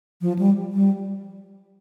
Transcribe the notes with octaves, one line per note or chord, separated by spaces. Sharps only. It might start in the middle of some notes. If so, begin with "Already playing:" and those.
F3
G3
G3